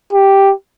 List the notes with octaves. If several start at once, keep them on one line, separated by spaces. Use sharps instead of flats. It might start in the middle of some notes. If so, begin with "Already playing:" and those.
G4